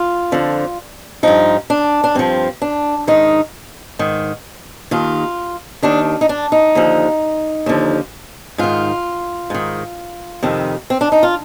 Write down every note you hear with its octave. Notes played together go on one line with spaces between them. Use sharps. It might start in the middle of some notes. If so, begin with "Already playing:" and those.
Already playing: F4
F2 D3 F3
G2 F3 D#4
D4
D4
G2 F3 C4
D4
G#2 D#3 D#4
G#2 D#3
D#2 D#3 F4
D#2 D#3 D4
D#4
D4
D#4
D#2 D3 F3
D#2 D3 F3
G#2 D#3 F4
G#2 D#3
F2 C3 D#3
C4
D4
D#4
F4